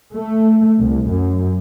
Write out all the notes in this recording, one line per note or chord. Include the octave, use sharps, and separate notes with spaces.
A3
C2
F#2